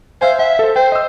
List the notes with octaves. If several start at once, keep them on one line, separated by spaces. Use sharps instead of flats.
C5 E5 F5 G#5
E5 F#5
A4 C5
C5 G5
D#5 E6